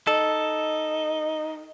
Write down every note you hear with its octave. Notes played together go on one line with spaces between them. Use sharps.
D#4 A4